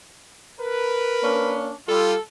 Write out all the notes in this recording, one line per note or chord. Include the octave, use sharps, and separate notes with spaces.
A#4 B4
A#3 C#4 D4
G3 F4 A4